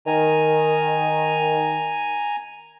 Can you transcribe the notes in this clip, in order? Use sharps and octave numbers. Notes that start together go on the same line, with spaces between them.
D#3 G#5 A#5